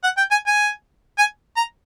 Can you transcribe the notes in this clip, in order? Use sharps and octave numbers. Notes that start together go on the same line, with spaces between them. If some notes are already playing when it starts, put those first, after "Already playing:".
F#5
G5
G#5
G#5
G#5
A#5